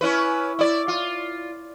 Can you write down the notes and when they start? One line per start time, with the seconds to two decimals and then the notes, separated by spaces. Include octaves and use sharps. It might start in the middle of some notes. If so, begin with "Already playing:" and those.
0.01 C#4 E4 B4
0.59 E4 D5
0.88 F4